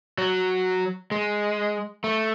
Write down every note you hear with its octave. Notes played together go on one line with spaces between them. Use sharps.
F#3
G#3
A3